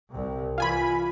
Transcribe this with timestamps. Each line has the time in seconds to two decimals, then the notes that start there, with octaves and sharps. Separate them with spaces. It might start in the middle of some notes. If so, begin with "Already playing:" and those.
0.10 C2 C3
0.58 E3 F4 G#5 B5